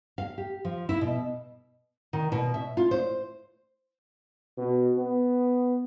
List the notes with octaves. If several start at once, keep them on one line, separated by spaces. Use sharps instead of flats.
F5
G4
F3
E4
B2
D#3
B2
E5
F4
C5
B2
B3